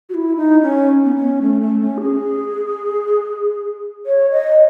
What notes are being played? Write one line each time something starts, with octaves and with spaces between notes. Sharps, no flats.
F#4
E4
D#4
C#4
B3
C#4
A3
A3
C#4
G#4
C#5
D#5